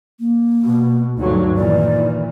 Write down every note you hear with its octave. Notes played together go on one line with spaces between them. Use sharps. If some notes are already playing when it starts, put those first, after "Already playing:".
A#3
B2
D2 G2 F#3 D#4
A#2 D#3 E3 D5